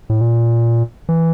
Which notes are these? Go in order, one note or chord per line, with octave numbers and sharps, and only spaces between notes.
A2
A#2
E3